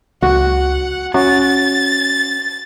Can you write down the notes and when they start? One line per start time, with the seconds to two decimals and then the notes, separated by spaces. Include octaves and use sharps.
0.22 C#2 F#4 F#5
1.14 C#4 F#4 A6